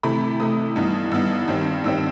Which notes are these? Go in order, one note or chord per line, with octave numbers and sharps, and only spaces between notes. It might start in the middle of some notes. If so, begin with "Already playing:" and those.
C3 E3 A3 B5
C3 E3 A3 D#6
G2 E3 B3 D#4
G2 E3 B3 D#4 E6
G2 D#3 G3 C4
G2 D#3 G3 C4 E6